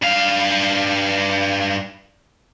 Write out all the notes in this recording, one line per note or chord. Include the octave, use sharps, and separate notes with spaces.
G2 F5